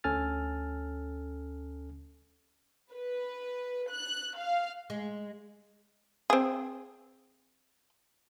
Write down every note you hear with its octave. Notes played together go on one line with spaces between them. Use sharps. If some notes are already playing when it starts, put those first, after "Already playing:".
D2 C#4 A4 G#5 F6 A6
B4
F#6
F5
G#3
C4 G#4